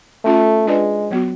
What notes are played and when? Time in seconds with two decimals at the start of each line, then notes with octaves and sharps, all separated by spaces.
0.25 A3 C#4 F4 A4
0.67 G#3 D4 F4 G#4 B4 D5
1.10 F#3 B3 F#4